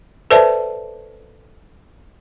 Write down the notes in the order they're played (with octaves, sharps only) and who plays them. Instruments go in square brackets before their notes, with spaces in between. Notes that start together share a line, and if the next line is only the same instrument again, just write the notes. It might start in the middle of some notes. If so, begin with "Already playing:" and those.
[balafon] A4 B4 C5 D5 E5 A5